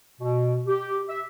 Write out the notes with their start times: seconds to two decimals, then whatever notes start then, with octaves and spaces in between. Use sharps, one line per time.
0.20 B2
0.67 G4
1.09 E5